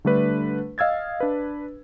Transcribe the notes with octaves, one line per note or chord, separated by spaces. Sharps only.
D3 G3 A3 D4 B4
D#5 F5 E6 G#6 A6
D4 B4